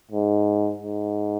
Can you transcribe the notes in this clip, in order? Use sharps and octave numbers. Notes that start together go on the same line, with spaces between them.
G#2
G#2